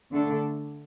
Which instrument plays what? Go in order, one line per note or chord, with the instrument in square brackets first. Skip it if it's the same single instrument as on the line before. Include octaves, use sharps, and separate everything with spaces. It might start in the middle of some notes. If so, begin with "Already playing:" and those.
[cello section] D3 A3 D4 A4